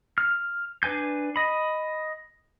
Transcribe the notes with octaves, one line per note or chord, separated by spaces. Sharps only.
F6
D4 B4 G#5 G6
D#5 B5